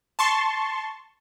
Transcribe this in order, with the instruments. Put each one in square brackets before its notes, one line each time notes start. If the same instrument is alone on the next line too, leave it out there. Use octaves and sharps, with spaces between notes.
[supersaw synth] A5 C6 C#6